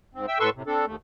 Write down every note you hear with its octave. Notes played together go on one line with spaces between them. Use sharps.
G#2 C4
E5 G5 E6
A2 A4 B4 C6 C#6 E6
A2 C3
C4 D4 A4
D#2 A3